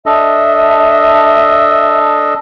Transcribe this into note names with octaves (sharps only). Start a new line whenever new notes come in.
D4 A4 D#5 E5